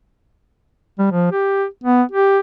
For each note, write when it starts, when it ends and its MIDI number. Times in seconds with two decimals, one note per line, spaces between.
0.99 1.07 55
1.12 1.31 53
1.32 1.65 67
1.84 2.03 59
2.11 2.39 67